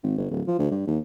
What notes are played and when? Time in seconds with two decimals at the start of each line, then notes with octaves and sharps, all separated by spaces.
0.03 G#1
0.18 G1
0.31 D1
0.47 F3
0.59 D2
0.71 G2
0.87 D#2